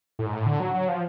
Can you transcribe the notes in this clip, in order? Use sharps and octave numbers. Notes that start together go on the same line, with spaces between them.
A2
G#2
A2
D3
F#3
F#3
F3